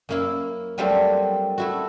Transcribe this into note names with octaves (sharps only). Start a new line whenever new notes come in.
F#2 A#3 E4
F#3 G3 A3 A#3 C4 D4
A3 E4 F#4